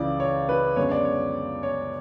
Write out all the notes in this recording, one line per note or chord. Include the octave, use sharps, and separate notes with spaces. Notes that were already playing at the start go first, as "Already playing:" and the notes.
Already playing: C#2 C#3 E3 D5
C#5
B4
F#2 D3 G#3 B3 C#5
D5
C#5
C#5